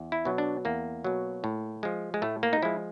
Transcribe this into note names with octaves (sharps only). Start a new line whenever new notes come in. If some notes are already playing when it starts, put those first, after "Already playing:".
Already playing: E2
E4
B2 F#3
D4
E2 A#3
B2 F#3
A2
F3 G#3
G#3
A2 A3
A#3
D#4
F3 G#3 E4